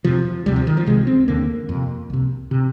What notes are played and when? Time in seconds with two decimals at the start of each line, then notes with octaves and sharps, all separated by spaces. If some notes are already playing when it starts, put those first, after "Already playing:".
0.04 F2 C3 F3
0.46 D2 C3 G3
0.56 F3
0.67 D#3
0.77 F3
0.86 C2 C3 G#3
1.07 C4
1.28 D#2 D3 A#3
1.69 F2 C3
2.10 C2 C3
2.51 C3